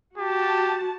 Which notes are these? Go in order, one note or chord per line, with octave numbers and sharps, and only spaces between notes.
F#4 G4 A5